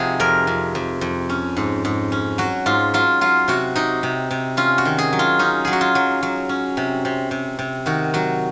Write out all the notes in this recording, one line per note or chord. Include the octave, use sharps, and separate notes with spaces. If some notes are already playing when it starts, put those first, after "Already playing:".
Already playing: C3 F3 D#4 F#4 G#4
F2 A#4
F2
F2
F2
C#4
G#2
G#2
C#4
F#3 F#4
G#2 F4
F#3 F4
F#3 F4
C3 F#4
C3 D#4
C3
C3
C#4 F4
F#4
D#3
G#4
F#3
F4
C#4 D#4
F#3 G#4
F#4
F4
F#3
F#3
C#4
C3
C3
C3
C3
D#3 F#4
F#3 F#4